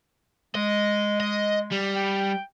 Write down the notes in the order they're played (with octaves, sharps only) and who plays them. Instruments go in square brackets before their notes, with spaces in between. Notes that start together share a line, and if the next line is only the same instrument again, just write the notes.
[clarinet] G#3 [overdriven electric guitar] D#5
[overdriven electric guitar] D#5
G3
[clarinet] G5